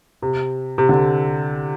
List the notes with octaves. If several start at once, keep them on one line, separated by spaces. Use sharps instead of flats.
C3
C3
D3